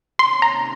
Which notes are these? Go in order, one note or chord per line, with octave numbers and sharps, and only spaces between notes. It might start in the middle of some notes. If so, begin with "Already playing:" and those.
C3 D#3 A#3 C#4 C6
A#5